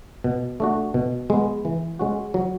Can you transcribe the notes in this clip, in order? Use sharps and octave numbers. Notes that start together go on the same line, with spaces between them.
B2
A3 D4 F#4
B2
G#3 B3
E3
G#3 C#4 F#4
F#3